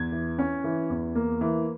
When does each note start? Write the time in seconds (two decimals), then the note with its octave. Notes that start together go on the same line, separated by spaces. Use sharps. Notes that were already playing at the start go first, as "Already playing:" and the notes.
Already playing: E2 G#6
0.12 E3
0.39 C#4
0.64 E3
0.90 E2
1.15 A#3
1.41 E3